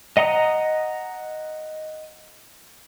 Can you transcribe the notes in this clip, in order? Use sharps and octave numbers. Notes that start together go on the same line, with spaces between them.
D#5 F#5 A#5 D#6